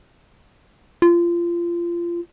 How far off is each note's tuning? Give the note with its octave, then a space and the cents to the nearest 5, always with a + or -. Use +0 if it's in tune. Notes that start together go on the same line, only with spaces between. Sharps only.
F4 -25